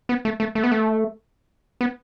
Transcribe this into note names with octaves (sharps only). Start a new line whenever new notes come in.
B3
A3
A3
A3
B3
A3
B3